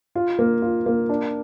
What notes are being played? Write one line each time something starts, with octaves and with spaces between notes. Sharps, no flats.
F4
A#3
F4
A#3
D4